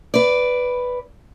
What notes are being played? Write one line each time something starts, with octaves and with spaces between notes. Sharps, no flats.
B4 D5